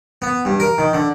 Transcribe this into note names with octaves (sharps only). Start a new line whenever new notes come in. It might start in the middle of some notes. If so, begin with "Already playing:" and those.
B3
G2
A#4
D#3
D3